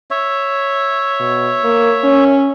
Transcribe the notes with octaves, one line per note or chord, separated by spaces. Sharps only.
C#5 E5
B2
A#3
C#4